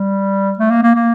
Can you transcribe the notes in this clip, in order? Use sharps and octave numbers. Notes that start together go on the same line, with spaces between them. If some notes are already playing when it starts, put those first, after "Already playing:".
Already playing: G3
A3
A#3
A#3
A#3